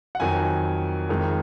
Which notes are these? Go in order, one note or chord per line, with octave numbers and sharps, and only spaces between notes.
F#5
F2 D#3 F#3 G#5
F2 D#3 G#3